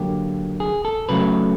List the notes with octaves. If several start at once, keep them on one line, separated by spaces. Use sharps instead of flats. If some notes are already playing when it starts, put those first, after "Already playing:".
Already playing: D3 F#3 A#3 G4
G#4
A4
C#3 F#3 A3 B4